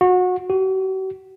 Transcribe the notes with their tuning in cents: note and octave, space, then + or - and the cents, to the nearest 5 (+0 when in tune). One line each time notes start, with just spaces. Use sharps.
F#4 -25
F#4 +45